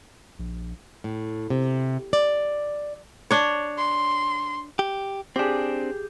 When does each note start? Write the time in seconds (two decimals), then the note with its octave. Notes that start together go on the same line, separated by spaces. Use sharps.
0.39 A#1
1.04 A2
1.50 C3
2.13 D5
3.31 D4 C#5
3.78 C6
4.79 G4
5.36 C4 D4 G4 G#4